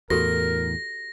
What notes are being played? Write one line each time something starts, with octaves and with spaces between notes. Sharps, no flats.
E2 A2 F#4 G4 A4 A#4 A#6